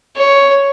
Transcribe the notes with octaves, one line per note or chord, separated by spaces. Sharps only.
C#5